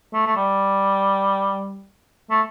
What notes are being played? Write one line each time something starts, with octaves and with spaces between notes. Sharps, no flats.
A3
A3
G3
A3